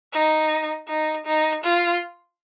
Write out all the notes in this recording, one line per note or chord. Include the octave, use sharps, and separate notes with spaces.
D#4
D#4
D#4
F4